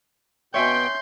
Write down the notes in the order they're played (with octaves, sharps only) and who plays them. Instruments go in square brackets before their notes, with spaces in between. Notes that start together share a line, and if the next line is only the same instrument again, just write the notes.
[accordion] B2 G5 [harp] C#5 E5 G#5 [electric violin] C6 G6